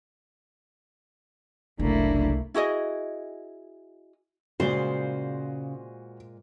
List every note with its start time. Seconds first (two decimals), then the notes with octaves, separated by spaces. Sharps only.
1.79 F#1 C2 A3 A#3 D4 E4
2.54 E4 F#4 G#4 D#5
4.60 A#2 C#3 G#3 F#4 C5 D5